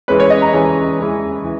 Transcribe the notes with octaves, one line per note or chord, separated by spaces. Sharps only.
E3 G#3 C#4 B4
C#5
D#5
A#5
E3 G#3 C#4 G#5
E3 G#3 C#4
E3